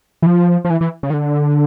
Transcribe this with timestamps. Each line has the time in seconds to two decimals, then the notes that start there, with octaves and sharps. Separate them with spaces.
0.22 E3
0.26 F3
0.65 F3
0.70 E3
0.81 E3
1.03 C#3
1.10 D#3
1.14 D3